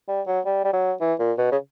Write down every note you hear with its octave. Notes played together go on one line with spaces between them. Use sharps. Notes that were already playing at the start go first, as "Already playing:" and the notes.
G3
F#3
G3
G3
F#3
E3
A#2
B2
C#3